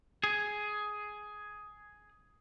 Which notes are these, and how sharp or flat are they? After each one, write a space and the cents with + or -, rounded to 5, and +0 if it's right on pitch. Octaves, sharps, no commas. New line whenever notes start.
G#4 +10